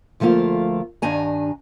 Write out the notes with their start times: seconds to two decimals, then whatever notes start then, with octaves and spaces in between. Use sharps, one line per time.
0.20 D2 F3 A3 A#3 F4
1.02 G2 D#3 D4 G#5 A#5